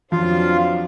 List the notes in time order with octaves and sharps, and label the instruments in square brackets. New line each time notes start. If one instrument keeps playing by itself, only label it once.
[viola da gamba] F2 F#3 D4 [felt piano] F3 [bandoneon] F4 F5